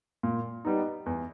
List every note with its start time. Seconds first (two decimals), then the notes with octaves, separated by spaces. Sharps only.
0.23 A#2
0.65 G3 B3 D#4
1.06 E2